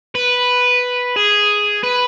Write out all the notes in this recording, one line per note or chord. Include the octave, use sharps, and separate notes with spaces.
B4
G#4
B4